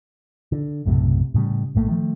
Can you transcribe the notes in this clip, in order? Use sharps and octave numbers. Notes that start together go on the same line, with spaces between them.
D3
B1 F#2 A2 C3
A2 C#3 F3 G3
A#1 A2 A3 A#3
D#3 F3 A3